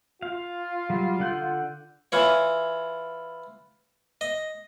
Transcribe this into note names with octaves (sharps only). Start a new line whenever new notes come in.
F4 F5
F#3 G3
D3 F#5 G6
E3 F4 C#5
D#5